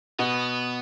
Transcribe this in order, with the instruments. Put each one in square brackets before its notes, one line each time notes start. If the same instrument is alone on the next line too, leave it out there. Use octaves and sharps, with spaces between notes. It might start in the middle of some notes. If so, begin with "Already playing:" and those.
[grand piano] B2 [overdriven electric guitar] B3